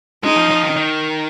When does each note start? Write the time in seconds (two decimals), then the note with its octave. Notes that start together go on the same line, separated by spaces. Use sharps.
0.24 G#3 D#4
0.37 F3
0.51 F3
0.63 D#3
0.76 D#3